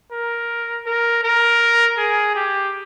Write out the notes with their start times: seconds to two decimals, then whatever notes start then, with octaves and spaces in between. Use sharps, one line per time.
0.12 A#4
0.86 A#4
1.24 A#4
1.97 G#4
2.35 G4